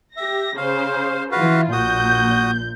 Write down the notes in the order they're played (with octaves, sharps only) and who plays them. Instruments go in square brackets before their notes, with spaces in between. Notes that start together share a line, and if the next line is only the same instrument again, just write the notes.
[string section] G4 A#6 [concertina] E5
[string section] C#3 C5 [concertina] F5
[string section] E3 F4 [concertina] F#4 B4 F5
[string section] A#1 A#2 G6 [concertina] F#4 D#6